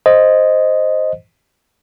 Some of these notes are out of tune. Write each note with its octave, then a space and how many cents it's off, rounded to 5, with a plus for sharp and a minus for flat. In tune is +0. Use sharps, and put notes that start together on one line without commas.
C5 +0 D#5 +0